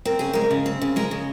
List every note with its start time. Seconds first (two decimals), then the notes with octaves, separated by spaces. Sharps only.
0.05 C4 A#4
0.19 C#3 G#4
0.33 G#3 A#4
0.51 C#3
0.66 C4
0.82 C#3
0.96 G#3 A#4
1.11 C#3